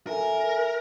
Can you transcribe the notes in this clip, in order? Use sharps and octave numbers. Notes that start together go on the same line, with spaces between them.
A4 A#4 E5 G#5